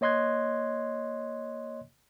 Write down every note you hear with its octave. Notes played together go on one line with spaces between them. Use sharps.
A#3 C#5 D#5 C6 F#6 G#6